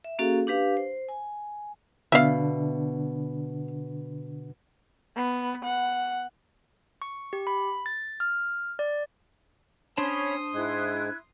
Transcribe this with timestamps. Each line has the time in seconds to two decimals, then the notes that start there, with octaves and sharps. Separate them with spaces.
0.04 E5
0.19 A#3 C#4 F#4 G#4 A4 F5
0.47 D4 G4 B4 F5
0.77 C5
1.08 G#5
2.12 B2 D3 D4 E5 F5
5.16 B3
5.65 F#5
7.02 C#6
7.33 G4
7.47 B5
7.86 A6
8.20 F6
8.79 D5
9.98 C#4 D4 C5 C#5 A5 B5 C6 D#6
10.54 G#2 G#3 E4 F#6 G#6